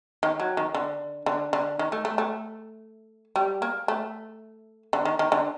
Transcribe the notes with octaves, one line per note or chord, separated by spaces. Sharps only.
D#3
F#3
D#3
D3
D3
D3
D#3
A3
A3
A3
G3
A#3
A3
D3
D#3
D#3
D3